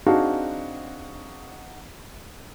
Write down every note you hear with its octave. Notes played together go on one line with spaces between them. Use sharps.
C4 D4 D#4 F#4 G#4 F5